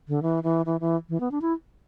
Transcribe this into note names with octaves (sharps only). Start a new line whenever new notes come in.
D3
E3
E3
E3
E3
E3
B3
D4
E4